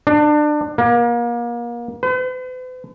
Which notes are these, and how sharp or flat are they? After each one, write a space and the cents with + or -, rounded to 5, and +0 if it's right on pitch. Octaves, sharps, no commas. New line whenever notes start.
D4 +25
A#3 +30
B4 +45